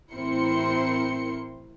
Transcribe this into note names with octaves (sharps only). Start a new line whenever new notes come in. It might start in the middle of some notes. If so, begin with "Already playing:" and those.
A1 C4 E4 A#4 C6 C#7